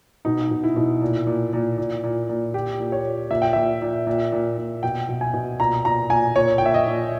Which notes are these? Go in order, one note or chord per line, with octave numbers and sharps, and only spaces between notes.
B2 D#4
B2
E4
B2
A#2
A#2
A#2
A#2
A#2
A#2
A#2 G4
A#2
C#5
A#2
A#2 E5
G5
A#2 E5
A#2
A#2
A#2
A#2
B2 G5
B2
G#5
B2
A#2 A#5
A#2 A#5
A#2 G#5
A#2 C#5
G5
A#2 E5
D#5
A#2